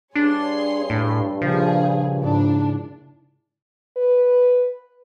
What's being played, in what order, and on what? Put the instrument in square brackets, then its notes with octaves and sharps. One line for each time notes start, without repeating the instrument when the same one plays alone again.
[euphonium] G2 [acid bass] D4 [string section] G#4 C#5 C6
[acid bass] A2
[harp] A#1 C#3 [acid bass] F3 [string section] G3 G#4
[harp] G#2 E4 [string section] D4
[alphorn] B4